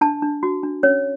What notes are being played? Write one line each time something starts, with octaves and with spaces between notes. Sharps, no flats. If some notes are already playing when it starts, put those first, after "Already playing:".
D4 A5
D4
F#4
D4
C#4 C#5